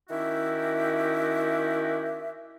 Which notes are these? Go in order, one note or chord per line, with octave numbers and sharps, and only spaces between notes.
D#3 C#4 E4 F#4 G4 E5